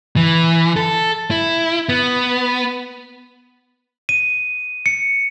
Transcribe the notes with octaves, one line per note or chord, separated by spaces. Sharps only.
E3
A4
E4
B3
D#7
C#7